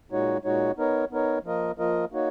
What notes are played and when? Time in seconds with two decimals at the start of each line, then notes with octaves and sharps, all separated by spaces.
0.11 A#2 G#3 D#4 F#4 C#5
0.44 A#2 G#3 D#4 F#4 C#5
0.78 B3 D#4 A#4 C#5
1.11 B3 D#4 A#4 C#5
1.44 F3 A#3 F4 A#4 D#5
1.78 F3 A#3 F4 A#4 D#5
2.12 A#3 D#4 F#4 C#5